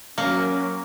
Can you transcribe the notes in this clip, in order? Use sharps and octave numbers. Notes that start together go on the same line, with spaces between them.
F#3 A#3 C#4 A#4